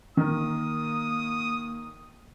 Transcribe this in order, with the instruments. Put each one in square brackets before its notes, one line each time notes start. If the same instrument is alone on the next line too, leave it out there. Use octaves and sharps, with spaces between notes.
[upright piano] D#3 A#4 [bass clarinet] A#3 [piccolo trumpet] D#6